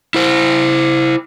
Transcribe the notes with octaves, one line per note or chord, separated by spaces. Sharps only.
E4 C5